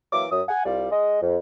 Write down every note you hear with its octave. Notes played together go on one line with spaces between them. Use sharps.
E3 F#3 A#3 E5 D6
F#2 D#6
F#5 G#5
C2 G3 F4 D5
G#3 D#5
F2